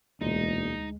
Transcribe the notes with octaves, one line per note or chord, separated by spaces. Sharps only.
E1 D2 A#2 G#3 D#4